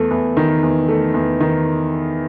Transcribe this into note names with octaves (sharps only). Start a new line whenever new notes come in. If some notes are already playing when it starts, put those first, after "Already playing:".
Already playing: E2 A3
E2
D#3
E2
A3
E2
D#3